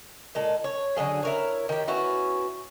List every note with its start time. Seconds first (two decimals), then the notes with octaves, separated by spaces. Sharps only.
0.35 A#2 G#3 A4
0.64 C#5
0.96 D3 F#3 A#3 G#4
1.23 E4 A#4 C#5
1.69 D#3 G4
1.87 B3 C#4 E4 F#4